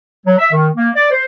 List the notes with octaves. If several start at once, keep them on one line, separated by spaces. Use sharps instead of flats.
F#3
E5
D#3
A#3
D5
C5